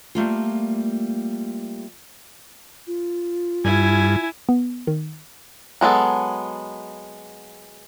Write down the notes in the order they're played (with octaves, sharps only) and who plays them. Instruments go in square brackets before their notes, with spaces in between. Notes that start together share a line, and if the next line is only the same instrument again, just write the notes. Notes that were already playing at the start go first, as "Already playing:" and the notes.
[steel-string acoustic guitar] G3 A3 A#3 F4
[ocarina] F4
[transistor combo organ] G2 [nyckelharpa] E4 G#5
[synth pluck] B3
D#3
[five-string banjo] F#3 G#3 B3 A4